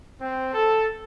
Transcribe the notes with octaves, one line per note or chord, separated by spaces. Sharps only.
C4
A4